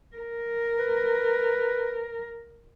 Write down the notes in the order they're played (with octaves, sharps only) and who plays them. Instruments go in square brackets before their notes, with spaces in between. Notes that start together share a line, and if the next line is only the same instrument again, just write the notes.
[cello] A#4
[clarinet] B4